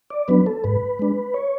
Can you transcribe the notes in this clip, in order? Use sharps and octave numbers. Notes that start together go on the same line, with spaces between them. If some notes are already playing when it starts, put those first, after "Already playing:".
D5
F#3 B3 D4 B4
A4
G#2 B4
G#3 D4
C#5